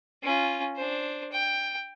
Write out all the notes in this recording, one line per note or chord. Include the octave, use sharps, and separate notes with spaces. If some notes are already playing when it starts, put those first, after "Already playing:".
C#4 F4
D4 C5
G5